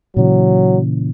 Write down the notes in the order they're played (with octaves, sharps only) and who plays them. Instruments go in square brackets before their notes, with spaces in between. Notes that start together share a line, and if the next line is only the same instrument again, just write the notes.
[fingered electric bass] A#2 C#3 E3 [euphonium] F#3